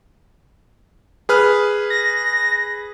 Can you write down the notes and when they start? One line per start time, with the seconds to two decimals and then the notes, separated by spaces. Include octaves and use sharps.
1.29 G#4 B4 F6
1.90 A#6